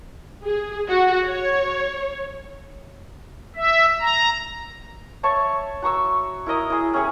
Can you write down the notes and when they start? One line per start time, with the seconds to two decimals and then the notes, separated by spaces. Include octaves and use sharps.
0.43 G#4
0.88 F#4
1.28 C#5
3.56 E5
4.01 A#5
5.23 C#5 E5 A5 C#6
5.82 F#4 A#5 C#6 E6
6.46 E4 A#4 D#5 D#6
6.70 E4 G#4
6.94 C#4 G4 G#4 C#5